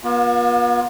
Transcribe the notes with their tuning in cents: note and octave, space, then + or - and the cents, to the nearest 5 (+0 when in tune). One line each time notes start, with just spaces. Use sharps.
B3 -45 F4 +25